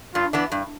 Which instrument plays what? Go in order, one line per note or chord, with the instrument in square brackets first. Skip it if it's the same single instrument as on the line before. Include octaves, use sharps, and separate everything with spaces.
[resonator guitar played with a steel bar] G2 [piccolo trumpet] F4
[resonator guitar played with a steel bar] E3 B3 D4
G2